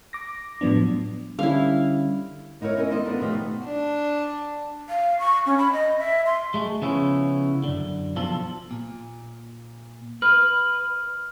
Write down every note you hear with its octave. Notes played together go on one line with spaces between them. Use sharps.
D6 A#6
A2 F3 F#3 B3 D4
D3 G3 C#4 E4 F5
A#3 D#4 E4 A#4 C#5
C#4 D#4 E4 A#4 D#5
E2 D#4 C5 D5 D#5
B3 D4 E4 F4 A4 A#4
D#3 F3 A3 G4
B2
D4
F5
C#6
C#4
B5
D#5
E5
C6
G#3 A3
C#3 F3 B3 C#4 E4
F#2 D3
B1 F3 F4 A4
A#2
B4 F6